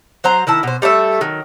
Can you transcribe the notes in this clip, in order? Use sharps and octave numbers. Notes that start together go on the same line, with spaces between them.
F#3 C5 A#5
D#3 E4 A5
B2 C5
G3 A3 B4 E5
D#3 F#3